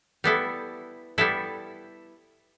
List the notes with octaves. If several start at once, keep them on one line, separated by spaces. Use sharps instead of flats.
G3 B3 E4 A4
G3 B3 E4 A4